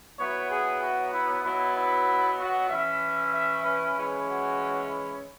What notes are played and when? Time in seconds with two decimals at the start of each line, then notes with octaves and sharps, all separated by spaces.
0.20 F#3 B3 E4 C#5
0.50 G#4
0.82 F#4
1.13 E4
1.44 B2 F#3 B3 E4
1.76 E4
2.39 F#4
2.70 E3 C#4 E4 E5
3.33 E5
3.64 B4
3.95 E3 G#3 C#4 E4
4.27 F#4
4.89 E4